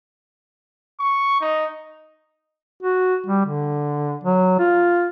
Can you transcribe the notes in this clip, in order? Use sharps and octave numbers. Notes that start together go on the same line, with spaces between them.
C#6
D#4
F#4
G3
D3
F#3
F4